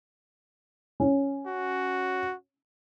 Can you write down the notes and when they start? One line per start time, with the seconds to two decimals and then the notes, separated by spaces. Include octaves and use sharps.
1.00 C#4
1.46 F#4